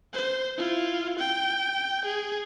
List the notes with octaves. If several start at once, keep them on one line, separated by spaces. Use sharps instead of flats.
C5
E4 F4
G5
G#4